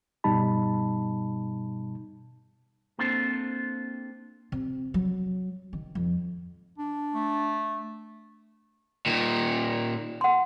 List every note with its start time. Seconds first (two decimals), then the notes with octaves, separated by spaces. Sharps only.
0.24 G2 B2 G3 D#4 A5 B5
2.99 A#3 C4 D4 F4 A4 C5
4.52 C3
4.94 F#3
5.73 D#3
5.95 F2
6.78 D4
7.13 A3
9.06 A#2 D#3
10.21 F#5 C6